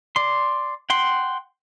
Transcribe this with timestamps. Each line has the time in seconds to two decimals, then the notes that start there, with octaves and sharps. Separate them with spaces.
0.16 D5 C6
0.90 F#5 G5 C6